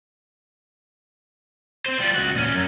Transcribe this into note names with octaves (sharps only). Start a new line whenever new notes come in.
C4 C5
G3 F4
C#2 F#4
A#2 C#4
F#2